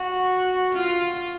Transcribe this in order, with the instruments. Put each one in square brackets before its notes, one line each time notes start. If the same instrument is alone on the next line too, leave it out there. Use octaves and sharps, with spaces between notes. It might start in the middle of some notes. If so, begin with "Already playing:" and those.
Already playing: [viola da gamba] F#4
F4